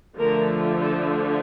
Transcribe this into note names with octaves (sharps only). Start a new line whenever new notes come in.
D3 F3 A3 A#4
A4